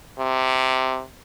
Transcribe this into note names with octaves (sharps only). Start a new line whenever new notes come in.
C3